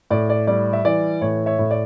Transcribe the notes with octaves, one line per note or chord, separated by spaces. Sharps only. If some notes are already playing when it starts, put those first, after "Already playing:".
A2 D5
D5
G3 D5
E5
E3 D5
A2 C#5
C#5 E5
A2
D5